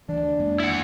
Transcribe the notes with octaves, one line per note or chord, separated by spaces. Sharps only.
D2 E3 D4
F2 G#3 A#3
E4 F#5